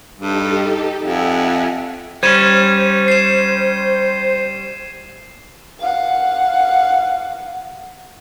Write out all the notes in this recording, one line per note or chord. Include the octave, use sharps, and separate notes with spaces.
G2 D#4 G4 A4
F2 E5 F#5 G#5
G3 C#4 C5 G#6 D#7 E7
C7 E7
F5 F#5